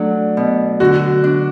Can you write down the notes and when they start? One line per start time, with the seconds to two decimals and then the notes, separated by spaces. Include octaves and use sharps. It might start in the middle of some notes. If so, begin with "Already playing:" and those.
Already playing: F#3 A3 D4
0.37 B2
0.80 D3 F#4
1.24 D4